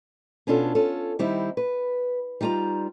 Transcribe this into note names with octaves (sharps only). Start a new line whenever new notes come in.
B2 C#4 D4 F4 A4
C#4 F4 A4
D#3 G3 C4 D#4 E4
B4
G3 D#4 F4 A5 A#5